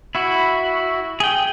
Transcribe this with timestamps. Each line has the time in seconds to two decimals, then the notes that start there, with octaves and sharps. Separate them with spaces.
0.15 E4 F#4
1.20 G#4 G5